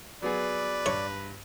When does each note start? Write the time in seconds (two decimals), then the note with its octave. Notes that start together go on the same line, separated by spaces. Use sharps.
0.22 F#3 B3 G#4 B4 D5
0.86 G2 C#5